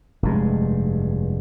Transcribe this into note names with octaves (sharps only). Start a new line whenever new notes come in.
F1 G2 G#3